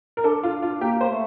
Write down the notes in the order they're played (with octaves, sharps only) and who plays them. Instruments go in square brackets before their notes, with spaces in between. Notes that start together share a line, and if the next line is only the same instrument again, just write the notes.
[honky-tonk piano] A#4
[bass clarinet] D4 [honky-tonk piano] A4
[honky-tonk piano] F4
F4
[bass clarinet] A#3 [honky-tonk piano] G4
[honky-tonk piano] C5
[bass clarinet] A3